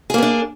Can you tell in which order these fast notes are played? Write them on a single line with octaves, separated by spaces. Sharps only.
G#4 A#3 B3 D4